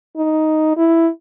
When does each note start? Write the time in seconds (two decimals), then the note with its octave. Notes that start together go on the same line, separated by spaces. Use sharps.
0.17 D#4
0.77 E4